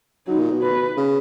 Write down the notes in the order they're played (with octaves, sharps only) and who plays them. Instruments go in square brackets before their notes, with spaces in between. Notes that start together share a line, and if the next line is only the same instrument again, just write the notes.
[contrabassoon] F#3 [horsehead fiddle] D#4
[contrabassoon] A#2
B2
[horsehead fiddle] B4
[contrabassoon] C#3